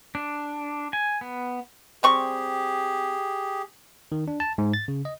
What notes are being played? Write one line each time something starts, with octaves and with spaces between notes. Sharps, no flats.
D4
G#5
B3
G3 C4 G4 G#4 C#6
D#3
D4
A5
G#2
A6
C#3
D#5